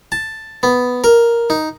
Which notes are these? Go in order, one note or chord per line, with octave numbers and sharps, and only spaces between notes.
A5
B3
A#4
D#4